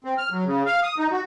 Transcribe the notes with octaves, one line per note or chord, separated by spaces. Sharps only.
C4
F6
F#3
C#3
F5
D#6
D#4
F#4